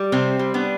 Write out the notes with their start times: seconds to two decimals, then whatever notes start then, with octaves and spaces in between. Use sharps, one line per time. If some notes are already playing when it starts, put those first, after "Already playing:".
Already playing: G3
0.12 C3 C4
0.39 G3
0.54 B3 D4